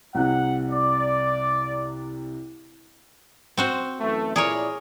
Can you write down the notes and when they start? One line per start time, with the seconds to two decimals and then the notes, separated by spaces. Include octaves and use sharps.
0.15 C2 C3 F#5
0.71 D5
3.58 C4 F#4 C5
4.00 F#2 E3 A3
4.36 A#2 E4 G#4 A#4 C#5 D5